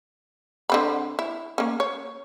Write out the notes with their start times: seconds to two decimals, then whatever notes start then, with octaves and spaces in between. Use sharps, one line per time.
0.70 D3 C4 B5
1.19 E4
1.58 A#3 C#4
1.80 C#5